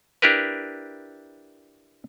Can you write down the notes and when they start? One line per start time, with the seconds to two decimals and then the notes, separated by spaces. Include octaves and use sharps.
0.22 D4 E4 G4 A#4 B4